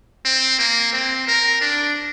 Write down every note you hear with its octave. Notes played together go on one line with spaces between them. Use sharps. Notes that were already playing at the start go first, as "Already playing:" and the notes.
C4
A#3
C4
A#4
D4